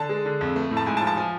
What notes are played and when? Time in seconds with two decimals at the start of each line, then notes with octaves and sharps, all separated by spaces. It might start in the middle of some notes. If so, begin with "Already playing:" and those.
Already playing: D3 A5
0.09 G#3
0.25 D3
0.41 F2
0.56 A3
0.71 A2
0.77 A5
0.86 G#2 G#5
0.97 A5
1.01 F3
1.07 A5
1.17 F3 G#5